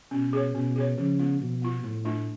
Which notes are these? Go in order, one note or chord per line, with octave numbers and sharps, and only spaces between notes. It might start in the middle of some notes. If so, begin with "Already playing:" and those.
B2 C#4
G#4 C#5
B2 C#4
G#4 C#5
C#3 F3
B3 F4
B2 F3
B3 F4
A2 F#3
A3 D4 F4